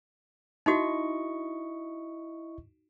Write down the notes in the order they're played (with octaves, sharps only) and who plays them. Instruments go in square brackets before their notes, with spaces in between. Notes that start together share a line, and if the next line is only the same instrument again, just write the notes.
[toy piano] D#4 F#4 [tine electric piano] E4 D#5 C#6